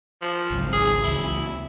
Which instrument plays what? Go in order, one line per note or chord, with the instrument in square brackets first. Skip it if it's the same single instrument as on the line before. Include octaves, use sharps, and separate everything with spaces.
[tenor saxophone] F3
[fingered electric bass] G#1 C#2 F#3
[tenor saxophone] G#4
[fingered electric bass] C#2 E3 [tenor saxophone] E4